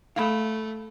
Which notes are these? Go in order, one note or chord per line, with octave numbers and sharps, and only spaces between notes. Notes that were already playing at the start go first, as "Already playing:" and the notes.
A3 F5 B5